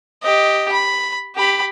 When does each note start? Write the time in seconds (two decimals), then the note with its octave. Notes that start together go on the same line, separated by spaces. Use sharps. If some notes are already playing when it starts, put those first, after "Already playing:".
0.23 G4 D#5
0.72 B5
1.36 G4 B5